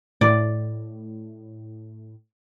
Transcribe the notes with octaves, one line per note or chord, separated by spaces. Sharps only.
A2 D5